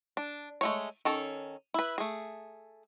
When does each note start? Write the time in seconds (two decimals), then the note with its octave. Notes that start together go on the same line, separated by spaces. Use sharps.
0.17 D4
0.61 G#3 A3 C#5
1.05 D#3 C#4 A4
1.74 E4 B4
1.98 A3 G#4